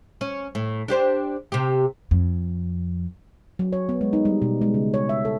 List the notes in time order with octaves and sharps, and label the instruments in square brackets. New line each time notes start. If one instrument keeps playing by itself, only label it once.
[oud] C#4
A2
D4 G4 C5
C3 G4
[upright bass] F2
[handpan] F#3
C#5
B3
G#3
D#4
G3
B2
G#3
C#3
C#5
E5
A4